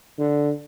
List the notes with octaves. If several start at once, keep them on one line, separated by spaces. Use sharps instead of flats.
D3